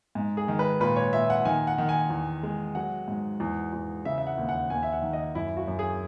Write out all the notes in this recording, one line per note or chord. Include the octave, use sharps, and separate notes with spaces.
G#2
G#4
D#3
B4
A#2 B4
C#5
A#2 E5
F#5
D#3 G#5
F#5
D#3
G#5
E2
G#3
F#3 F#5
G#2
E2
E2
C#3 E5
E5
F#5
D#2
F#5
D#2 G#5
E5
F#5
D#3
D#5
F#2 E4
F#4
F#2
G#4